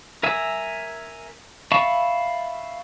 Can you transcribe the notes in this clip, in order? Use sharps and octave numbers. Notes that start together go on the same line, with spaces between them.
A#4 E5 G#5 E6
E5 F5 A5 B5 C#6